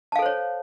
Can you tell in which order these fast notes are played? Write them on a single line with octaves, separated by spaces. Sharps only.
A5 F5 A4 C5 C#5